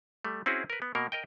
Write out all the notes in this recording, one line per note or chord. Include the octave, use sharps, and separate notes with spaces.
G3 A3
C4 C#4 E4 F#4 G#4
A#4 B4
B3
B2 A#3 A#4
A#4 D#5 G5